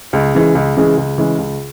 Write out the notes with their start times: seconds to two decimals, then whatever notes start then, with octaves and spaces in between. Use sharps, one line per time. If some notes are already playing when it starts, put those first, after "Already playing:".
0.13 C#2
0.35 C#3 E3 G#3
0.55 C#2
0.77 C#3 E3 G#3
0.97 C#2
1.18 C#3 E3 G#3
1.38 C#2